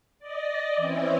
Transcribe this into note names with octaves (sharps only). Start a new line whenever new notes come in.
D5 D#5
E3 C4 C#4 E4